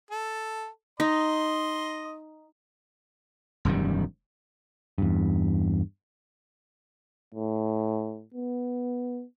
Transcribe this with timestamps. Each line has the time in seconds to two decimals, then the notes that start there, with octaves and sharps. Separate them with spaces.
0.11 A4
1.00 D#4 D#5 C6
3.65 E1 F#2 D#3 G3
4.98 E2 G2
7.35 A2
8.35 B3